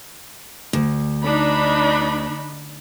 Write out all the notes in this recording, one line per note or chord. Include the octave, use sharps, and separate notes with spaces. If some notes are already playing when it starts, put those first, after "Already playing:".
D2
D4 D#4 B5